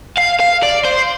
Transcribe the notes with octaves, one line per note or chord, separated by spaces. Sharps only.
F5
F5
D5
C5